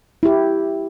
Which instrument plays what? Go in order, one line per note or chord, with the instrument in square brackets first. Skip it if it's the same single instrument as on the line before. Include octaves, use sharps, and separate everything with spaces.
[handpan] E4 G4